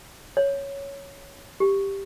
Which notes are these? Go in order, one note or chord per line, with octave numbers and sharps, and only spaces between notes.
C#5
G4